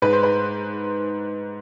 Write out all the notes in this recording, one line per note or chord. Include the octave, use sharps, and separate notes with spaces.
G#2 G#3 B4
C5
B4